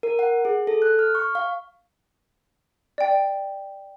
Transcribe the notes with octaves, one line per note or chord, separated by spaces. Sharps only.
A#4
F#5
G#4
A4
F#6
F6
C#6
F5
D5 G5